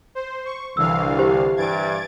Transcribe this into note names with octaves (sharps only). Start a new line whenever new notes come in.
C5
C#6
C2 D3 E3 F5 E6
G4 C5
G2 E3 G#6 A6 D7